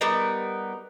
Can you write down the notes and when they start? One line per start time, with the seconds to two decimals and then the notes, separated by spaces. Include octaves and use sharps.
0.01 G3 B3 D#4 A#4